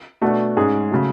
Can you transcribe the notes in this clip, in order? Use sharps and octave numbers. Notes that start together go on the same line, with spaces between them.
B2 A3 D4 F#4
G#2 G#3 C#4 G#4
C#3 F#3 A3